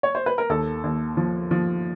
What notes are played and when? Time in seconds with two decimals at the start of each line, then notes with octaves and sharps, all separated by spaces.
0.03 C#5
0.15 C5
0.26 B4
0.38 A#4
0.49 D#2 A4
0.84 D#2
1.17 F3
1.51 F3